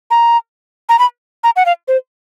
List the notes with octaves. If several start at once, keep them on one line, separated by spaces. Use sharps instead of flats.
A#5
A#5
B5
A#5
F#5
F5
C5